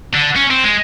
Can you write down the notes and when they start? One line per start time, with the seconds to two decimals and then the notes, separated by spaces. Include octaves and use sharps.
0.14 D3
0.36 C#4
0.51 C4
0.64 G#3